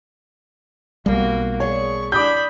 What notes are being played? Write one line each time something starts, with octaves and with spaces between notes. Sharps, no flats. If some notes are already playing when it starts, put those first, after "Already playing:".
B1 B2 G3 A#3 F#4
A3 D4 G#4 C#5 C#6
D4 D5 E5 A5 B5 D6 D#6 G6